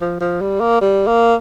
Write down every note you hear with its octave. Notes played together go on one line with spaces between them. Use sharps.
F3
F3
G3
A#3
G3
A#3